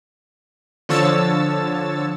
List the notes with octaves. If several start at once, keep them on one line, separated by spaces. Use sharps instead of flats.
D3 F3 C#5 A5 E6 A6